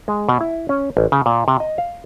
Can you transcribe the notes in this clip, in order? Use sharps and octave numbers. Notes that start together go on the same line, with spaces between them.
G#3
B2
E4
C#4
A1
C#3
A#2
C3
D#5
F5